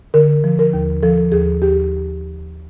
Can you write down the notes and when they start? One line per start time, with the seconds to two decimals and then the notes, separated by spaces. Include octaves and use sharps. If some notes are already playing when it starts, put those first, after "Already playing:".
0.14 D3 A#4
0.44 F3
0.59 A#4
0.73 D#2
1.03 F3 A4
1.32 D#2 G#4
1.62 D#2 G4